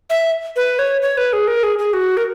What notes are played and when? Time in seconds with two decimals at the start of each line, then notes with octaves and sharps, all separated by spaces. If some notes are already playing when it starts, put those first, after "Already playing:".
0.10 E5
0.56 B4
0.79 C#5
1.02 C#5
1.17 B4
1.33 G#4
1.48 A#4
1.63 G#4
1.79 G#4
1.93 F#4
2.17 A#4